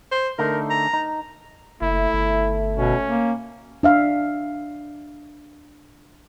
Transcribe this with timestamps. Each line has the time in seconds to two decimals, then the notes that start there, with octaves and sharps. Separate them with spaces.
0.12 C5
0.39 D3 A3 D#4 A#4
0.70 A#5
0.93 D#4
1.81 F#1 A3 E4
2.13 G1
2.77 B2 C#4
3.08 A#3
3.83 D4 E5 F5